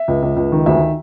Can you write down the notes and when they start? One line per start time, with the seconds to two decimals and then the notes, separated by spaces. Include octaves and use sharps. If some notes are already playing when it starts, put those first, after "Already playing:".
Already playing: E5
0.08 C#2
0.23 C#2
0.37 C#2
0.52 D#3
0.66 D2 E5